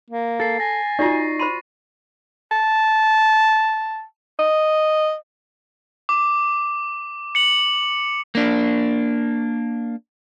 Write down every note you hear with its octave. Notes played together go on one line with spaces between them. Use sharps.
A#3
A4 A6 C7
G#5 A#6
D#4 F4 F#4 D5 C#6 C7
C5 B5 C6 D#7
A5
D#5
D6
C#7 F#7
A#3 D4